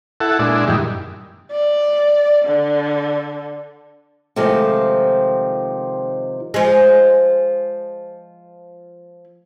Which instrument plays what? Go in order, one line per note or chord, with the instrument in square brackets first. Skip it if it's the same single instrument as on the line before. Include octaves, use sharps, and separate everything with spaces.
[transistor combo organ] E4 A4 F#5
A#2 G#3 D4 E4
F#2 D#3 E3 G3
[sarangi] D5
D3
[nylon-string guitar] C3 D#3 F3 G#3 A3
[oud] F3 G#3